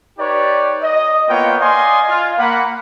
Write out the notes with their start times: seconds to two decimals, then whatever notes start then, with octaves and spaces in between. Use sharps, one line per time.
0.19 D#4 G4 B4 C#5 D5
0.83 D#5
1.29 A#3 B3 E4 F4 C#5 G5
1.61 D5 D#5 F5 G#5 C6
2.09 F4
2.38 A#3 F#5 B5